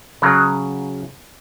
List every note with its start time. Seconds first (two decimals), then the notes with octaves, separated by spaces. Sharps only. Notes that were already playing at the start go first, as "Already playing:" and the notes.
0.22 C#3 F#3